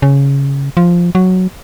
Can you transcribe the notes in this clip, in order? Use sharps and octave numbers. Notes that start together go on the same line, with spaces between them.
C#3
F3
F#3